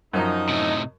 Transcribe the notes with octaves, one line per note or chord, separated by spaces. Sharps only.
F#2 F3 D#4
A2 C3